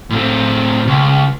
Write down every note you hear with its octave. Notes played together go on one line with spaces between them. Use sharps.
A2 C4
C#2